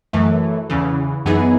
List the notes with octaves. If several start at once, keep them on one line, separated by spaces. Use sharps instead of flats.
F#2 E3 A3
E2 C#3 E3
F#2 E3 B3 D#4 G#4